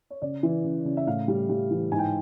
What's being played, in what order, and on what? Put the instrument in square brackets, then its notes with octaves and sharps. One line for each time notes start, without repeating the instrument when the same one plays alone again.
[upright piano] C#5
C#3 D5
E3
C#3
C#3
E5
A2 F5
G3
G3
E3
G#2 G#5
G5